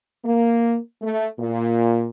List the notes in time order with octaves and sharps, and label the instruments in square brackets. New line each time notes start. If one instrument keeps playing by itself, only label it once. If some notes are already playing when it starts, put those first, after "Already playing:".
[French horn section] A#3
A3
A#2